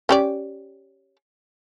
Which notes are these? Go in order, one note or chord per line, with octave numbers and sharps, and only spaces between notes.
C#4 G4 D5